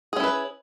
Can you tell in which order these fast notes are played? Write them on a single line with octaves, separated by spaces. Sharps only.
G#4 C#4 E4 B4